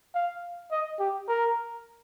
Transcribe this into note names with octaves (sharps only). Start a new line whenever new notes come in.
F5
D#5
G4
A#4